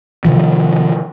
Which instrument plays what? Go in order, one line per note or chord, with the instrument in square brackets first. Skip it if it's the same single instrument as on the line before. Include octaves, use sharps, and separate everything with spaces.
[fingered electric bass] C3 D#3 F3